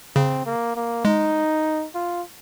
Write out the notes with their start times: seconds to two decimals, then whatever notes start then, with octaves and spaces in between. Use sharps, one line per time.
0.16 C#3 C4
0.46 A#3
0.75 A#3
1.05 G#3 D#4
1.95 F4